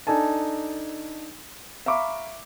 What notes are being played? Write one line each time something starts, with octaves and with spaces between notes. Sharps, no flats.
D4 D#4 A4 G#5 A5
E5 F5 A#5 B5 C#6 D6